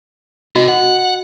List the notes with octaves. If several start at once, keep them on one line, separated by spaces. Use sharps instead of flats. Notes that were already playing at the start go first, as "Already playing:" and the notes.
C3 F#4 D#5
F#5